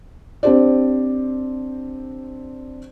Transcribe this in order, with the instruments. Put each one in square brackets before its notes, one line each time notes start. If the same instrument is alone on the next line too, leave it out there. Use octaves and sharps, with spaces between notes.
[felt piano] C4 D4 G4 C5 D5